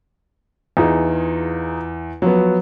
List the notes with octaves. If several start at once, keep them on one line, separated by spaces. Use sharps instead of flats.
E2 D#4 F4 G#4
F3 F#3 B3